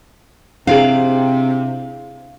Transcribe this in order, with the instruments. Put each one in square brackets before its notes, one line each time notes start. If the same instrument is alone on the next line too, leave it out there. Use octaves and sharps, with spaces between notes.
[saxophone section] C3 [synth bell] D4 E4 G#4 [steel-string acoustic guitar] F5